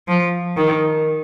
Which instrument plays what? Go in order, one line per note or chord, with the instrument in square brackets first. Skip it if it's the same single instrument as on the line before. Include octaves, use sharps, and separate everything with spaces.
[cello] F3
D#3